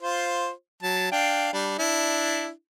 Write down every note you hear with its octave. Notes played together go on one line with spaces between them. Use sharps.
F4 C5
F#3 A5
D4 F5 G5
G3 D4
D4 E4